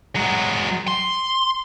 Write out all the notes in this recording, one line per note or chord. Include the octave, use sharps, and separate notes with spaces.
F#3 G#3
C6